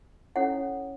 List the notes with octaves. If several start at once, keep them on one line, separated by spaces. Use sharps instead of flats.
C#4 E4 A4 C#5 F#5